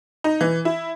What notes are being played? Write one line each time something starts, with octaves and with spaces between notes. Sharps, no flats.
D#4
E3
E4